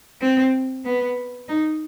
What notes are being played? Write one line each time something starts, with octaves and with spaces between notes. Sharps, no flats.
C4
B3
D#4